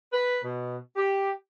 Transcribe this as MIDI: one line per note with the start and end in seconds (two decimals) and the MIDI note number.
0.13 0.39 71
0.44 0.78 47
0.96 1.30 67